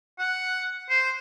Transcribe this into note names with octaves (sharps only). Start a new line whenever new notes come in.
F#5
C5